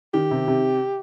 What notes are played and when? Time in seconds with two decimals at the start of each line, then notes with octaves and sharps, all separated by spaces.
0.14 D#3 G4
0.31 C3
0.48 C3